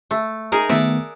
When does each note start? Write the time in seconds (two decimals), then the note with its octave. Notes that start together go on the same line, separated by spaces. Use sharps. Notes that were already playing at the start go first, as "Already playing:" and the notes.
0.11 A3
0.52 D#4 G#4 A#4
0.69 D#3 A3 B3 D5 E5 F#5